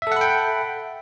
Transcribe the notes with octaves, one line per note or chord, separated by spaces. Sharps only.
A4 E5 F#5 G5 B5